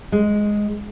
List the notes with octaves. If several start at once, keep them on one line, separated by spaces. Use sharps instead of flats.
G#3